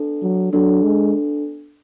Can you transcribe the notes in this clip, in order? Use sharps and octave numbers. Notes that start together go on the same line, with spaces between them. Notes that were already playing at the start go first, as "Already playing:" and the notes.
Already playing: B3 D4 A4
F#3
F#3 B3 D4 A4
G#3